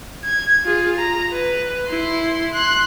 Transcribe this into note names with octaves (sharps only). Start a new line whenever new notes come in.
G#6
F4 G#4
A#5
B4
E4 C6
C6 F#6